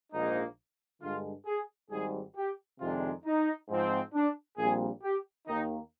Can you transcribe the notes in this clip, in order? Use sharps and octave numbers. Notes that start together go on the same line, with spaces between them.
A#1 G#2 F3 A#3 D#4
G2 D3 G#3 F4
G#4
G#1 G#2 G3 G#4
G4
F2 C3 D#3 G#3 D4 F4
D#4
G#2 F3 C4
D4
A#1 A#2 G3 C4 G#4
G4
D#2 D#3 A#3 D#4